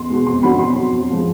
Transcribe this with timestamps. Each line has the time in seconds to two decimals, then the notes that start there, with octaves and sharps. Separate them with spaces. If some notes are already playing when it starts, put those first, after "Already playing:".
Already playing: E2 C6
0.10 B2 G#3
0.26 F2 C6
0.43 D3 F#3 B5
0.59 B2 C6
0.76 F#3
0.92 F2
1.10 C3 F3 G#3